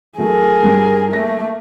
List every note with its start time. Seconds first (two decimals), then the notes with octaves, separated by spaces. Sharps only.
0.18 F#3 A3 G#4 A#4
0.63 G2 G3
1.13 A3 A#3 A#6